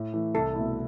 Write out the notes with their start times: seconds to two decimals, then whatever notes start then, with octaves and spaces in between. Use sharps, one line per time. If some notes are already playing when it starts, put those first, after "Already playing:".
Already playing: A2
0.13 E3 A3
0.34 C2 A4
0.55 B2 A3 E4